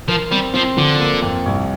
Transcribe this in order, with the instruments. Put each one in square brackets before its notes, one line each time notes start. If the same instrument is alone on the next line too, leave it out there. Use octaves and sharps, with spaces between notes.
[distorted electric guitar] F3 [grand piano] A#4
[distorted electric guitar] G3 [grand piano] C4
[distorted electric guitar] F3 [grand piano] C4
[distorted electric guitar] D3 [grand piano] F3
[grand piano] A#3
F2
C2